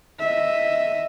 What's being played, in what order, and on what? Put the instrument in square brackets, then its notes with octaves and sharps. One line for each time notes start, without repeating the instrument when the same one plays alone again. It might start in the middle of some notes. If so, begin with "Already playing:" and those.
[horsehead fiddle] D#5 E5